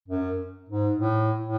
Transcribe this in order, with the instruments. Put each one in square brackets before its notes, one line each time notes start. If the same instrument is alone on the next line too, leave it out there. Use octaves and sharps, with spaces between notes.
[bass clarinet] F#2
G#2
A2
A2